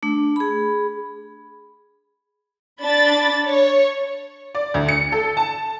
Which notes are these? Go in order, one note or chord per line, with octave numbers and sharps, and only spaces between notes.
A3 D4
G#4 B5
D4 B5 A6
C#5
D5
D2
C#7
A4
A5